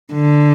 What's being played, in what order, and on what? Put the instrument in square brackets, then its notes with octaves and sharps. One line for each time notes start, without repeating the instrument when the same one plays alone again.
[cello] D3